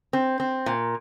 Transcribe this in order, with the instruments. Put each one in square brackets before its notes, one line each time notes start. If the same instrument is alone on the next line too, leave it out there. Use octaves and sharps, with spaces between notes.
[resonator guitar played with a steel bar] C4
C4
A#2